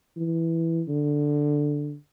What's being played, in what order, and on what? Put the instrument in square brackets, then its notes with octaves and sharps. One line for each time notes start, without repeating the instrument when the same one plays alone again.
[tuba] E3
D3